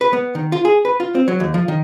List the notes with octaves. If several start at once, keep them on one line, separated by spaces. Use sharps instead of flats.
B4
B3
D#3
F4
G#4
B4
F4
C4
F#3
D#2
F3
D#3